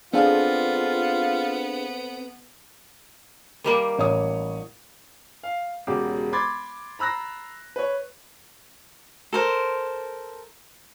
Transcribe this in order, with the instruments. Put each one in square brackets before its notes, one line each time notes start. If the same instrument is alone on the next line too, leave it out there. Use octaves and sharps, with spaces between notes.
[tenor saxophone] B3 [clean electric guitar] C4 A4 [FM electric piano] D4 G#4 F5 [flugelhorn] F4
[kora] D#3 G3 A#3
[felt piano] A1 C#5 D#6
[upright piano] F5
E1 C#3 F#4 G4 D6
B5 C6 D6 G#6 A6
A#5 B5 E6 F#6 A#6
B4 C#5
[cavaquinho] A4 A#4 C5